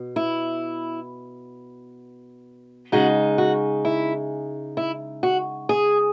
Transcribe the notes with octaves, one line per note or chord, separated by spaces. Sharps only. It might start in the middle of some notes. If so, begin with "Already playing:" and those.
Already playing: B2
E4
C#3 G#3 D#4 F#4
F#4
E4
E4
F#4
G#4